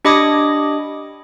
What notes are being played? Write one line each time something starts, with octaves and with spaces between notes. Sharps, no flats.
D4 G4 D#5 B5 D6 D#6